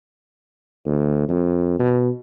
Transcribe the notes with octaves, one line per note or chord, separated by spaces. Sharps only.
D2
F2
B2